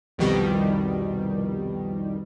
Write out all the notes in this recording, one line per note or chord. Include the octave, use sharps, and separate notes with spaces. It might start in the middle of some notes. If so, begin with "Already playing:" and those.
C2 F2 B2 D#3 G3